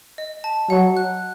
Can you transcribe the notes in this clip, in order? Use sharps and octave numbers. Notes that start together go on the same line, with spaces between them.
D#5
A5
F#3 F#5
F#6